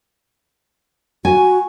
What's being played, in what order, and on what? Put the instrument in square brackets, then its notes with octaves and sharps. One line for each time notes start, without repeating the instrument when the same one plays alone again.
[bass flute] F#4 [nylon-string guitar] G#5